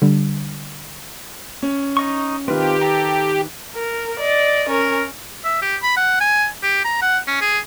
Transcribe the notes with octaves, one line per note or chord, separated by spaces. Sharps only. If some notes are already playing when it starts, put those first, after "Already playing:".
D3 G3
C#4
D#4 D#5 C#6
D#3 C4 F4 G4 A#4 B4
A4 G5 A#5
A#4
D5 D#5
C#4 A#4
E5
G4
B5
F#5
G#5
G4
A#5
F#5
C#4
G#4